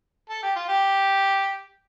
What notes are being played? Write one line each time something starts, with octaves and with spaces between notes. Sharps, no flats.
A4
G4
F4
G4